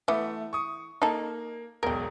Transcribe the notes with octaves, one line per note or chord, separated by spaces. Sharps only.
E3 A3 B3
C#6 D#6
A#3 D#4 A4
E1 B1 A#4 G5